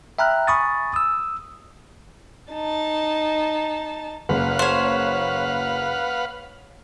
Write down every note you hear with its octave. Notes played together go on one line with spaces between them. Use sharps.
E5 G5 A#5 B5 F6 F#6
G#5 B5 C#6 D#6 A6
D#6 E6
D#4 A5
F#1 B4 F5 F#5
C5 C#5